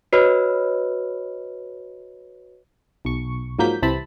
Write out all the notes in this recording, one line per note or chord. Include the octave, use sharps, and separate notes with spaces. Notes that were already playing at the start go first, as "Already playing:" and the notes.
F#4 B4 C#5 D#5 B5 F6
B1 C#6
G#2 F3 F#3 A#3 G6 B6
C2 C3 E3 C4 A5 B5